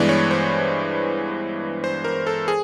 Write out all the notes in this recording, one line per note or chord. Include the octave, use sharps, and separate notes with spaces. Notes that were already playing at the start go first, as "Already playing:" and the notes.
Already playing: G2 E3 G#3 B3 D5
C#5
C5
C5
A#4
A4
G#4